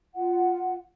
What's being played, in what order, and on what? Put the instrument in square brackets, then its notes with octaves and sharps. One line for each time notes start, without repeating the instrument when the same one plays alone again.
[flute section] F4 F#5